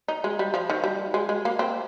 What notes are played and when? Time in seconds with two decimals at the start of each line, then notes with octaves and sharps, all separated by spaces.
0.08 D#4
0.24 G#3
0.39 G3
0.54 F3
0.70 D#3
0.84 G3
1.14 G#3
1.29 G#3
1.45 A#3
1.59 C4